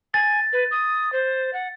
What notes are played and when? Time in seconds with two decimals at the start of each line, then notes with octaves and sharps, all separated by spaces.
0.14 G#5 A6
0.53 B4
0.71 D#6
1.13 C5
1.53 F#5